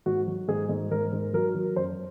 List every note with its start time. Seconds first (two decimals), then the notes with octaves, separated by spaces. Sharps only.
0.06 G#2 F#4
0.27 F#3
0.48 G#2 G#4
0.69 G#2
0.91 G#2 A#4
1.12 G#2
1.33 F#3 A#4
1.55 F#3
1.76 F#2 C5